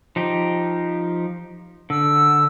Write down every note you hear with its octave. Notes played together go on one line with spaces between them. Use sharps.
F3 D#4 G4
D3 E6